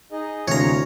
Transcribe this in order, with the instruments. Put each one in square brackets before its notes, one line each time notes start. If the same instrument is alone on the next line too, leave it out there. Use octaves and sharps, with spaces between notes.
[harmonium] D#4 G#4 D#5
[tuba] D2 [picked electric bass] C3 E3 [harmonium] C#4 F5 [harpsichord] C#5 A#5